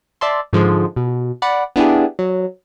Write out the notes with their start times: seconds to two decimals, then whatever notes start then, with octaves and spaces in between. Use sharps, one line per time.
0.21 D5 E5 A5 C6
0.53 G#2 D3 F3 G#3
0.96 B2
1.42 D5 F#5 B5
1.76 B3 D4 E4 G4 G#4
2.19 F#3